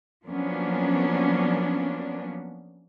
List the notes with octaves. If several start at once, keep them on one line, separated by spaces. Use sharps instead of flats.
F3 F#3 A#3 B3 C#4 D4